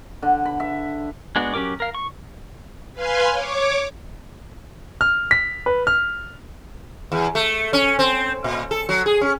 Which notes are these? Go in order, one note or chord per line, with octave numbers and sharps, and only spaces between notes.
D3
B5
E5
G#3 B3 D4 F#4
F#3 C#4 G4 A#4 D6
A#4 F5
C#6
B4 F5 G#5 C6
C#5 D6
F6
B6
B4
F6
E2
A3
C#4
C4
A#2
A4
F#3
G#4
C#4